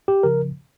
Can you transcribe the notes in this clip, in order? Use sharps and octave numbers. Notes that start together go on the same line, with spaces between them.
G4
C#3 F3 A#4